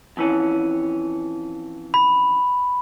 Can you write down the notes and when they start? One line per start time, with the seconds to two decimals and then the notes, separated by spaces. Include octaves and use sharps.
0.17 F2 E3 C#4
1.94 B5